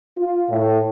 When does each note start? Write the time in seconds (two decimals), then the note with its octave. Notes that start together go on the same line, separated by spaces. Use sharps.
0.18 F4
0.50 A2